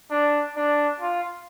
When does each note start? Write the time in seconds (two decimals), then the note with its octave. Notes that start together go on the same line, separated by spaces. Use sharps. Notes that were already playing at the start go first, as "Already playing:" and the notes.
0.11 D4
0.57 D4
1.00 F4